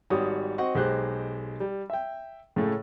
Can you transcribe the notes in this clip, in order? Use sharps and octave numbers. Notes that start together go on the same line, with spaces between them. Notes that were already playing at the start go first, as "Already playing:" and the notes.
G#1 G3 F#4 C#5 D#6
C4 F#4 D#5 F#5 C#6
B1 G#3 G4 C5 F#6
G3
E5 G5
A2 C#3 G#3 A3